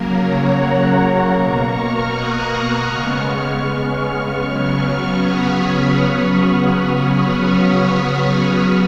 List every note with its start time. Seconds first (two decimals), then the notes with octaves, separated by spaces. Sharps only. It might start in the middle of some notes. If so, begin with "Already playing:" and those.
Already playing: C#3 F#3 A#3 A#4
0.13 A#4 C#5
0.52 F#5 A#5
1.30 B2 A#3 A#5 C#6
1.69 C#6 F6
2.08 D#6 F#6
2.47 C#6 F6
2.86 C#3 G#3 B3 C#6 F6
4.41 C#3 F#3 B3 C#6 F6
5.19 B5 D#6